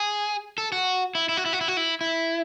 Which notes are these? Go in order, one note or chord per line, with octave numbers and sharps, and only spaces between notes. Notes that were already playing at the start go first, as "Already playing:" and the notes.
Already playing: G#4
A4
F#4
E4
E4
F#4
E4
F#4
E4
F#4
E4
E4